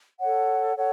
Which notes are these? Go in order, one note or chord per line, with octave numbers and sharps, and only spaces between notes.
A4 C#5 F#5
A4 C#5 F#5